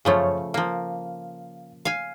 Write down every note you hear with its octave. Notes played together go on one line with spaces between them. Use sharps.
F#2 C#3 F3 A3 C#5
F3 A#3 F5
F5 G#5